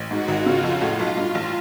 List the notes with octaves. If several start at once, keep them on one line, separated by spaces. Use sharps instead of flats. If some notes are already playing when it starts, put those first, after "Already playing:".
Already playing: A1
G#2 F#4
G#1
C#3 F4
F2
A2 F4
B1
G2
A1